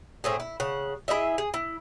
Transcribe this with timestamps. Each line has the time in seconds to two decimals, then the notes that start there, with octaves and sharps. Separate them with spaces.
0.24 A2 C4 G#4
0.40 E4
0.60 C#3 F#5
1.08 E4 G#4 D#5 E5
1.38 G#4
1.54 E4